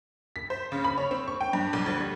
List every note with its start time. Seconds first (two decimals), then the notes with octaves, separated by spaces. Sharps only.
0.36 B6
0.50 C5
0.72 C#3
0.84 B5
0.98 C#5
1.11 C4
1.28 C#6
1.41 G5
1.53 G2
1.73 B1
1.86 D2
2.00 G3